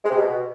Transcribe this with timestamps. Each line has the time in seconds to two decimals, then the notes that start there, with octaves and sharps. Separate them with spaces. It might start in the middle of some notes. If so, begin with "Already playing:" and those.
0.04 G#3
0.10 C3
0.16 B2